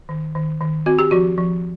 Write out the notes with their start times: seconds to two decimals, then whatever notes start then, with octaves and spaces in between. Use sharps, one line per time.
0.09 D#3
0.35 D#3
0.61 D#3
0.86 C4 F#4
0.99 G4
1.11 F3 F#4
1.38 F3